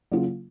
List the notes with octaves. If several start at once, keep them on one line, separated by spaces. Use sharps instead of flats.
C#3 F#3 A#3 F4